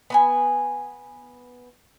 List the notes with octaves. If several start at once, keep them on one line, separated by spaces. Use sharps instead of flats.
B3 B4 G#5